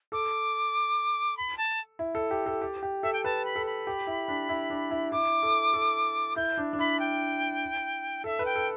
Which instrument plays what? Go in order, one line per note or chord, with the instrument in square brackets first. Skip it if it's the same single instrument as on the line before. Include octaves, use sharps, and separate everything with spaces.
[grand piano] A4 [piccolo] D6
[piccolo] B5
A5
[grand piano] E4
A4
G4
A4
G4
G4
[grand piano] A4 [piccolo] E5
[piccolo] G5
[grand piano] B4 [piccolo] A5
[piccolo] B5
[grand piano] A4
[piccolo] B5
[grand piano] G4
E4
D4
E4
D4
E4
[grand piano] E4 [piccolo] D6
[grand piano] A4
A4
[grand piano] E4 [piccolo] G6
[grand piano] D4
D4
[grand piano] E4 [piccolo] B5
[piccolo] G5
[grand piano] A4 [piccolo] E5
[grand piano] B4
[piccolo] G5
[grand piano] A4